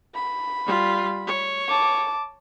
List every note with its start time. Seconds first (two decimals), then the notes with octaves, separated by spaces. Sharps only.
0.15 B5
0.65 G3 F4
1.27 C#5
1.68 A5 D6